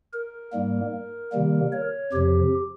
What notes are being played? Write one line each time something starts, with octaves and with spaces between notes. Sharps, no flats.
A#4
G#2 G3 A#3
C3 D#3 G3 A#3
C#5
F2 C3 F3 G4